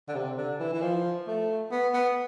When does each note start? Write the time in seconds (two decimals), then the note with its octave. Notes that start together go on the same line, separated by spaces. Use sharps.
0.08 D3
0.15 C3
0.37 D3
0.60 E3
0.73 E3
0.82 F3
1.27 A3
1.71 B3
1.93 B3